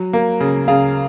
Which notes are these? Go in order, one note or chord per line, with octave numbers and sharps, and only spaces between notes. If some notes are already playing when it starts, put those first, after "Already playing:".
Already playing: F#3
A#3
C#3
C#3 F5